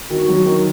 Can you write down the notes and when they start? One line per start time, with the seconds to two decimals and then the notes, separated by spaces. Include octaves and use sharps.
0.10 D#3 F#4
0.28 F#3
0.46 D#3